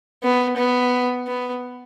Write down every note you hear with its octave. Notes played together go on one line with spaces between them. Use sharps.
B3
B3
B3